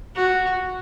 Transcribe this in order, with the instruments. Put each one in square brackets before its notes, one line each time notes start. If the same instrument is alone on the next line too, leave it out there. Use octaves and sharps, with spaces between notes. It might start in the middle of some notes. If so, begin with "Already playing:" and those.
[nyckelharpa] F#4